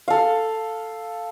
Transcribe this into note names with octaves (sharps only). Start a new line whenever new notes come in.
A4 F5